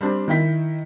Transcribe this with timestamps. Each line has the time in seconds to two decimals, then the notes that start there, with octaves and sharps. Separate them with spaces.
0.01 G3 C4 D4
0.28 D#3 E4 G5 B6